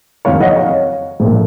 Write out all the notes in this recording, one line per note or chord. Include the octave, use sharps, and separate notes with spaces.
F#1 F2 D#3 F#3 C#5 F5
D#5 F#5
C#5 F5
A#1 A#2 A3